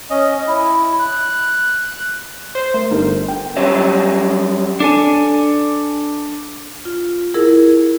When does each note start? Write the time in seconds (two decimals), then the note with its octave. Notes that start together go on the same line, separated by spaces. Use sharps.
0.10 C#4 D#5
0.48 E4
0.99 F#6
2.55 C5
2.74 A3 A#4
2.91 G1 D#4 A#4
3.28 G5
3.57 F#3 G3 C#4 G4 C#5 E5
4.80 D4 A4 G#5
6.85 F4
7.34 E4 G#4 A#4